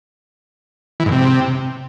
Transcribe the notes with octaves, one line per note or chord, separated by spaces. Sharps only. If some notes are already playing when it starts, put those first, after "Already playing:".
E3
G#2
C3